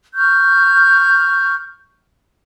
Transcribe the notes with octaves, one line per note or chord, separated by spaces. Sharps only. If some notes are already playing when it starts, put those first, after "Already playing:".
C#6 F6 G6